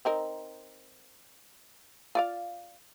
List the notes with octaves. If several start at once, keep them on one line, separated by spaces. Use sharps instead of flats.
C4 D#4 A#4
F4 D5 F5